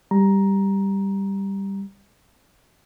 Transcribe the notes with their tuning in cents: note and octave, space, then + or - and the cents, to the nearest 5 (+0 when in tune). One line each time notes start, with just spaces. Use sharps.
G3 +0 A#5 +10